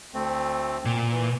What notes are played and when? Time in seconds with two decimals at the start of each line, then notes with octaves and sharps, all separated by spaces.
0.14 D2 A3 C4
0.85 A#2
1.12 E3